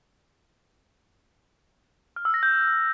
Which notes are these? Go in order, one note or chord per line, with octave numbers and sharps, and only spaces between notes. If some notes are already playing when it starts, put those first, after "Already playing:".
F6
E6
A#6
G6